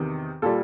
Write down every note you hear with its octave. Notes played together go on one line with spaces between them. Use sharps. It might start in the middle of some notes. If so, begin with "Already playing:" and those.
Already playing: E2 C3 D#3
A#2 G3 A4